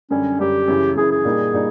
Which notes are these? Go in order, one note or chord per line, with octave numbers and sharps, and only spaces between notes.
F#2 D3 G3 C#4
F#2 D3 G3 G4
F#2 C#3 E3
F#2 C#3 E3 G#4
G#4
A#2 G3 A#3 D#4
A#2 G3 D#4